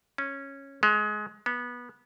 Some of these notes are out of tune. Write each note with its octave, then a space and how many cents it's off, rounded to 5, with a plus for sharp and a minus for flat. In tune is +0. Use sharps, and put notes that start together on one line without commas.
C#4 -10
G#3 +20
B3 -20